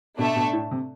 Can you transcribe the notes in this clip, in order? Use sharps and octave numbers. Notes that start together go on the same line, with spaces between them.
B2 A3 D4 A4 E5
B2
A2
C3